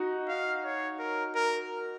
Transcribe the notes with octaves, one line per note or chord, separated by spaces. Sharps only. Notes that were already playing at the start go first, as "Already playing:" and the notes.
Already playing: D#4 F#4
F5
C#5
A#4
A#4